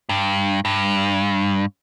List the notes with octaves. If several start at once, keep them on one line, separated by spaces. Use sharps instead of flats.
G2
G2